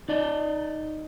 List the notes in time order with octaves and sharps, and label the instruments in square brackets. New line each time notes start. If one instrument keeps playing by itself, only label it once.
[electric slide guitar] D#4 D5 D#5